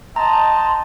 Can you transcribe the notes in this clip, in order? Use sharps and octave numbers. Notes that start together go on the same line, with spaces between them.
D#5 G5 A5 A#5 C6